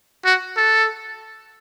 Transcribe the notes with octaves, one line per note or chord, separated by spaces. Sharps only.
F#4
A4